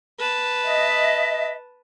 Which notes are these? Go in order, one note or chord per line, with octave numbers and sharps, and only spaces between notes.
B4 A5
D#5 E5